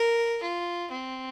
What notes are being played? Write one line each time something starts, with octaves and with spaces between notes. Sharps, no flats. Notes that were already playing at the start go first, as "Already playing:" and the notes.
Already playing: A#4
F4
C4